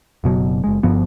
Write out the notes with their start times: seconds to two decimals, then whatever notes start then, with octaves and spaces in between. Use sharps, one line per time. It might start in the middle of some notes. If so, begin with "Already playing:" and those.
0.24 F#1 B2 F#3
0.64 F#1 G#3
0.83 G1 G2 F3 B3